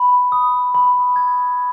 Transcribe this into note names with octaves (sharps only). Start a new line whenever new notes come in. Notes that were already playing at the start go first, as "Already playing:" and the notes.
Already playing: B5
D#6
B5
G#6